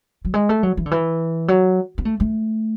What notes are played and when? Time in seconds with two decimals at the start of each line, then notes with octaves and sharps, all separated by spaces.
0.25 F#3
0.34 G#3
0.49 A3
0.63 F#3
0.77 E3
0.86 D3
0.91 E3
1.48 F#3
1.98 B3
2.05 A3
2.20 A3